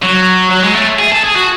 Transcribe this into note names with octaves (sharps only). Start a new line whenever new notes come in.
F#3
F#3
G#3
A3
G#4
A4
G#4
F#4